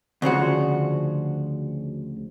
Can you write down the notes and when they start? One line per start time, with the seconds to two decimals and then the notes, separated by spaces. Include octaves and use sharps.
0.22 D2 C#3 F3 F#4